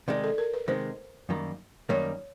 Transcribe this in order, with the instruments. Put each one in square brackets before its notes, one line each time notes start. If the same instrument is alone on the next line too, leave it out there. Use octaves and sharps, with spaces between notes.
[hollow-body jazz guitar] C3 D#3 G#3 [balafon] D5
[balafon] A4
A#4
B4
[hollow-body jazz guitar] C3 D#3 G#3 [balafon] C5
[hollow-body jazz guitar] F#2 D#3 G3 A#3
[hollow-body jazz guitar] F#2 D#3 G3 A#3 [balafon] C#5